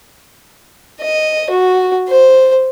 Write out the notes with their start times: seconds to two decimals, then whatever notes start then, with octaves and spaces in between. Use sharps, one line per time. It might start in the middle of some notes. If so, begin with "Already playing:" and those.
1.02 D#5
1.50 F#4
2.08 C5